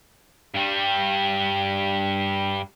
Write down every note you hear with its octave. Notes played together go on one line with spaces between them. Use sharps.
G2 G3